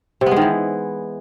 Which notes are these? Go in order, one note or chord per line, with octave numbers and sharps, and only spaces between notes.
C3
B3
G#3
D#3
E3